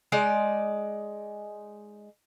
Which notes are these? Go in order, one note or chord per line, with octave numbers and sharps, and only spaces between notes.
G#3 D#4 D5